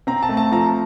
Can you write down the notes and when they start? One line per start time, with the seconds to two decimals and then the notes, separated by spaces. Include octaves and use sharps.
0.07 C4 A#5
0.23 A5
0.29 A3
0.37 A5
0.52 F3 A#5